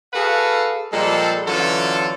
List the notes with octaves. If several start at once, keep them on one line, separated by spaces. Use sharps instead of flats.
F#4 G#4 A4 B4 F5
A#2 F3 G3 G#3 A4
D3 E3 F#3 C#4 F4 A4